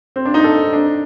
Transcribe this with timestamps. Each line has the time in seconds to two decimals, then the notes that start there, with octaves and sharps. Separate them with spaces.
0.16 C4
0.25 D4
0.34 D#4
0.44 A4
0.73 D4